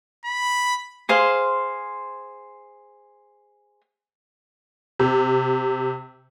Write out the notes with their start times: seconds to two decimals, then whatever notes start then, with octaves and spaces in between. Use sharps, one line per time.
0.25 B5
1.09 G#4 C5 F5 C6
4.99 C3